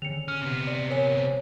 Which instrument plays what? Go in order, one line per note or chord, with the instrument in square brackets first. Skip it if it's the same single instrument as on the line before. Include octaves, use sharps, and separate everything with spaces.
[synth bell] D3 D#3 [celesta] C#7 F7
[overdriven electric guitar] C#4 [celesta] F6
[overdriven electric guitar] C3 B3
[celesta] D5
[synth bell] A#4 G#5 [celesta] C#5
[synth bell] C5